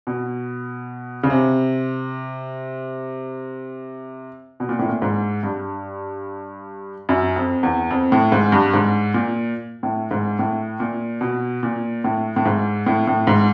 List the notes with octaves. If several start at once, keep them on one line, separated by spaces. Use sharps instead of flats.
B2
C#3
C3
B2
A#2
A2
A#2
G#2
G2
F#2
F2
E2
F2
A2
G#2
G2
G#2
A#2
A2
G#2
A2
A#2
B2
A#2
A2
A2
G#2
A2
A2
G#2